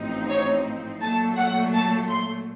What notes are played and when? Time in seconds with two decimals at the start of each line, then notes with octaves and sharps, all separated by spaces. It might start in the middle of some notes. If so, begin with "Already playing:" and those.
Already playing: A1 A2 F3 C4 D#4
0.29 C#5
1.01 A#2 F#3 A3 A5
1.37 F#5
1.73 A5
2.09 C6